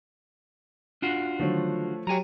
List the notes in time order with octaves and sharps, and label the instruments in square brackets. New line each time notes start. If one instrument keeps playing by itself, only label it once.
[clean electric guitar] D4 F4 F#4
[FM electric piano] D3 D#3 F#3 [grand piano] F3 A3 C#5
[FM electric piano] F#3 G4 [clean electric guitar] C#5 G#5 A#5